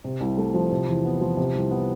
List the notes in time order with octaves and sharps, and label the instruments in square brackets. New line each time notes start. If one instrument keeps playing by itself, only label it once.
[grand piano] C3
C2
A3
F3
C3
E2
B3
F3
C3
C2
B3